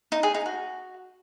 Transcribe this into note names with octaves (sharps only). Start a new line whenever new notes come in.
D#4
G#4
D#4
F#4